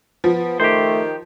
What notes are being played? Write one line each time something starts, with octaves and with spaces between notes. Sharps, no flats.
F3 B3
D#3 A3 G4 C5